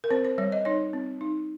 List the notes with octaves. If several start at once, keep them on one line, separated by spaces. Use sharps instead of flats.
A#4
C4 C5
C5
G3 C#5
D#5
D#4 C#5
C4
D#4